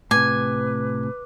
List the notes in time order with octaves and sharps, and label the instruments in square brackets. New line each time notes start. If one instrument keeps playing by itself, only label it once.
[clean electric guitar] A2 C3 [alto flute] B4 [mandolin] G#5 [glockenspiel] D6